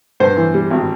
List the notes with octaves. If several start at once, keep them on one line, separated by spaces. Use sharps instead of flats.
G2 C5
E3
G3
G#1